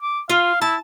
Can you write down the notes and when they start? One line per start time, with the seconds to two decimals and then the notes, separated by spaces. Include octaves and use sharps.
0.02 D6
0.30 F4 F5
0.61 E4 A5